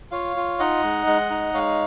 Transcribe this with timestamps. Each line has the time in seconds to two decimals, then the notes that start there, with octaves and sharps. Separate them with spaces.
0.12 F4 C#5 F5
0.36 F4
0.59 D#4 D#5 F#5
0.83 G#3
1.07 G#3
1.30 D#4
1.54 G#3 C#5 F5